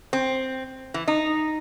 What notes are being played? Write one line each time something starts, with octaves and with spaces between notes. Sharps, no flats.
C4
E3
D#4